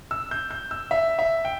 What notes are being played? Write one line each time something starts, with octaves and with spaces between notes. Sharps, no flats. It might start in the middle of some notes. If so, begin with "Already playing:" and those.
E6
G6
G6
E6
E5
E5
G5